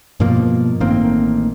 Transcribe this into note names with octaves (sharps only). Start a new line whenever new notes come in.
G2 B2 F3 A#3
A1 D#3 A#3 C4